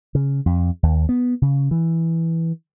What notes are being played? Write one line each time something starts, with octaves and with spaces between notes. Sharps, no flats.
C#3
F2
D#2
B3
C#3
E3